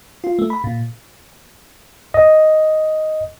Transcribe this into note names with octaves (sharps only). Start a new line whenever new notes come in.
F4
A3
B5
A#2
D#5